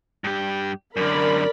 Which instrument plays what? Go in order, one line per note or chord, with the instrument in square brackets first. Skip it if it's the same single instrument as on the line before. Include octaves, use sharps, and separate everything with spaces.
[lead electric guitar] G2 G4
[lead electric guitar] F#2 D3 [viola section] A#4 D5 B5